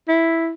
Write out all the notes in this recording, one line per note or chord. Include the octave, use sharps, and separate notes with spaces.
E4